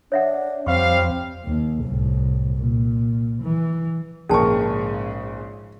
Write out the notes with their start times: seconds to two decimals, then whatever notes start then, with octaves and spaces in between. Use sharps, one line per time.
0.12 D4 C#5 E5 F#5
0.67 F2 G3 C4 F5 C#6
1.45 D#2
1.83 C2 A2
2.56 A#2
3.42 E3
4.29 A#1 G#2 C#3 C#4 G#4 A#4 A5 C#6